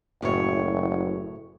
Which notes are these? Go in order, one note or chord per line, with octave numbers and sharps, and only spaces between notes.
F#1 F#2 A2 C#5